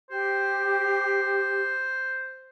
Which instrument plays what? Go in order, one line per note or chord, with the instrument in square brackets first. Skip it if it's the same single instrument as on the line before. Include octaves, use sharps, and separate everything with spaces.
[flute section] G4 [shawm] C5